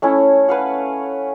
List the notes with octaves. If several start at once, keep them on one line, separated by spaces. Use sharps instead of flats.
A3 C#4 E4
B4 F5 F#5